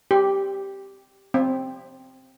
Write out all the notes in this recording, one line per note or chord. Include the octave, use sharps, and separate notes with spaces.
G4
C4